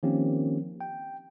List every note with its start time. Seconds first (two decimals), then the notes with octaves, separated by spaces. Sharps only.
0.03 D#3 F3 A#3 C4 C#4 G4
0.81 G5